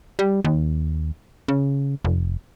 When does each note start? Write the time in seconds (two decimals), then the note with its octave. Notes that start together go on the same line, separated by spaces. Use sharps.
0.19 G3
0.45 D#2
1.48 C#3
2.05 F1